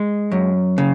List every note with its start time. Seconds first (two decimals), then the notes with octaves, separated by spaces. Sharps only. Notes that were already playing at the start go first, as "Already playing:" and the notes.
Already playing: G#3
0.32 F#2
0.78 C#3